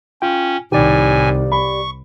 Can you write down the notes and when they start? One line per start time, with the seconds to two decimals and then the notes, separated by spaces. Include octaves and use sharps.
0.22 C#4 F4 G5
0.72 C2 A2 D#3 G4 D5 G#5
1.52 B5 C#6